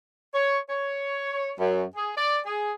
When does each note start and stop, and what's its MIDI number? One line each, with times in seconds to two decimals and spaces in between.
0.34 0.57 73
0.69 1.51 73
1.59 1.83 42
1.96 2.12 68
2.16 2.38 74
2.45 2.72 68